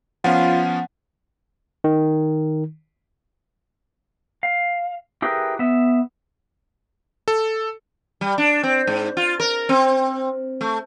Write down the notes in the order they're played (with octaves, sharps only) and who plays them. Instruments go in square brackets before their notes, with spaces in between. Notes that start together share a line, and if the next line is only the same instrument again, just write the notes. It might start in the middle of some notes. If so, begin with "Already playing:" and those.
[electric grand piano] F3 B3 C#4 [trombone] F4 [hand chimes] F#5
[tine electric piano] D#3
[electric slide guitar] F5
E4 G4 G#4 A#4 B4
B3 E5
[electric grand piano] A4
[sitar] G3
D4
C4
G#2
F4
A#4
C4
A3